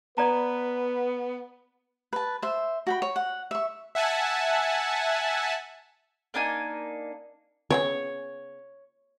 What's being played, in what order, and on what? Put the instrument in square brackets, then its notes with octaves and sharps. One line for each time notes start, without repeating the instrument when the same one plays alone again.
[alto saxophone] B3 [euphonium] B4 [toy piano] D5 A#5
[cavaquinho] B4 A5
C5 E5
F#4 G5 B5
C#5
F#5
E5 C#6
[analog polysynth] E5 F#5 G#5 A5
[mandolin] A#3 D4 D#4 G#5
[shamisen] C#3 G3 B3 [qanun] C#5